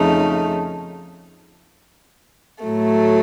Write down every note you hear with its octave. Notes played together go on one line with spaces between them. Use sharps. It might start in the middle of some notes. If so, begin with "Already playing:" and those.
Already playing: F2 C#3 A3 D#4
A2 F#3 A3